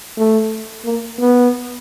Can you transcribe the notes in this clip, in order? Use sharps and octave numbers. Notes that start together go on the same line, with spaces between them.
A3
A#3
B3